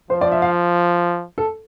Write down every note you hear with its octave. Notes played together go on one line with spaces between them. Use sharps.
F3 C5
D5
E5
F5
A4